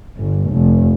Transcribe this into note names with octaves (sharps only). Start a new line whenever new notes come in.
G1
F1